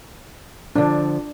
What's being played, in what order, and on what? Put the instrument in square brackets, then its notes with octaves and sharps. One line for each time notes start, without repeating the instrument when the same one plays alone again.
[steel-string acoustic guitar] D3 F3 [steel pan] D4